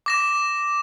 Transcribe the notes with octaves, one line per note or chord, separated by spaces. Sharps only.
D6 A#6 E7